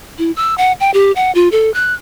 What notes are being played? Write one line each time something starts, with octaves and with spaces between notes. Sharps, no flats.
E4
E6
F#5
G5
G4
F#5
F4
A4
F#6